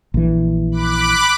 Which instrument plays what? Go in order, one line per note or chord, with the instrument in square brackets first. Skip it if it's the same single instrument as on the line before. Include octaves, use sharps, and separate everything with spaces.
[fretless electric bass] A#1 E3
[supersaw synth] B5 D6 F#6